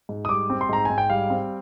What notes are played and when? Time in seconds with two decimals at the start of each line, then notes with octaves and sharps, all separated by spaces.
0.09 G#2
0.25 D#6
0.29 G3 D6
0.50 C4
0.61 C6
0.69 G#2 A#5
0.85 G#2 G#5
0.98 G5
1.10 G3 F5
1.30 C4